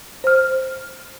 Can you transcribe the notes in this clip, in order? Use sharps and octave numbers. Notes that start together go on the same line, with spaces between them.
C5 F6